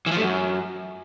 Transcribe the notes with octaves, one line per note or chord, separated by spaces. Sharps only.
E3
F3
A3
F#2